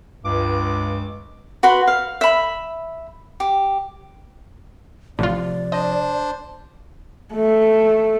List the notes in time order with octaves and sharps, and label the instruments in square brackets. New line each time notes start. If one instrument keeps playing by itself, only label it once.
[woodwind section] C#2 G2 D6
[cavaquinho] F#4 B4 B5 C6
F5
E5 B5
G4
[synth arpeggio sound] A1 F4 [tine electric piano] C3 F3 [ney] D5
[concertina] D4 C5 [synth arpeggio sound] D#5
[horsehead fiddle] A3